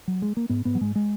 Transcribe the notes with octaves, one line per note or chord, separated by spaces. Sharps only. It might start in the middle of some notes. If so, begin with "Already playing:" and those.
F#3
G#3
A#3
G#2 B3
G#2 B3
F#3
G#2 G#3
G#3